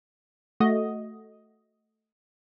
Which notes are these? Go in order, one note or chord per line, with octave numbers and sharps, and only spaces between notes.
A3 F#4 D#5